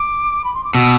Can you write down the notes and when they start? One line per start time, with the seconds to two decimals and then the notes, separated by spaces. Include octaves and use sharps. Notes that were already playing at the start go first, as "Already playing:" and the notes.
Already playing: D6
0.44 B5
0.54 C6
0.64 D6
0.74 B2 E6